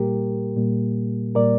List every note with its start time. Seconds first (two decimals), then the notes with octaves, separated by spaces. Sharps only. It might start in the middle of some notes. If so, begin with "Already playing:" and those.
Already playing: A#2 G3 A#3 G4 A#4
0.56 A#2 G3 A#3
1.35 A#2 G3 A#3 A#4 D5